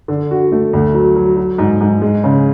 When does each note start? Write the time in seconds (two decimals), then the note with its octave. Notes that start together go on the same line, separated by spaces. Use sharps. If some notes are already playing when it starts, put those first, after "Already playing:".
0.08 D3
0.31 F#4
0.52 A3
0.73 D2
0.94 F#3
1.16 F#3
1.37 F#3
1.58 G#2
1.81 G#2
2.02 G#3
2.24 C#3